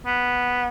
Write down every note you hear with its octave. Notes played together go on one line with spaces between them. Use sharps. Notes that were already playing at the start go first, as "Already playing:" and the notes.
B3